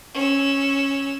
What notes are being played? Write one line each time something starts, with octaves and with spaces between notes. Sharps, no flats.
C#4 E6